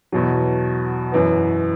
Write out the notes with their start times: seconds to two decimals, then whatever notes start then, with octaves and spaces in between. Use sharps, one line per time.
0.12 E2 B2 F#3
1.12 F#2 E3 B3